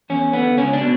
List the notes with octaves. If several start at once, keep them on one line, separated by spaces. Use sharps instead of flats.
E2 C#4
D3 B3
C#2 C#4
D4
B2